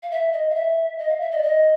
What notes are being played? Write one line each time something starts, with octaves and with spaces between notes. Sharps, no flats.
F5
E5
D#5
F5
E5
D#5
F5
E5
D#5
D5
D#5